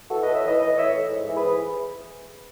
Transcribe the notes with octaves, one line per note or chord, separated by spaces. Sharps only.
E3 F#4 A4
B4 D#5
A2
C#5 E5
E3 B4 D#5
A2 B4 D#5
E3 C#5 E5
A2
G#2
E3
G#4 B4
E3